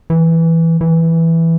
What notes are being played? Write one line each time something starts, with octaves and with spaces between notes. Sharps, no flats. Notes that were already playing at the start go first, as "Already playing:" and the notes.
E3
E3